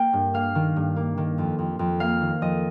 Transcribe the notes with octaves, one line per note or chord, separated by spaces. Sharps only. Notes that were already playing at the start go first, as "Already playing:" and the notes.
Already playing: A#3 G5
G2
A#3 F5
D#3
G2
A#3
D#3
F2
F2
F2
A#3 F5
D#3
F2 D#5